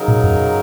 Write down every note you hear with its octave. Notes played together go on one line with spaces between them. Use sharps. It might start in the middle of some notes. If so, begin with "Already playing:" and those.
Already playing: C#3 F#3 D#4 A#4
A#2
F#2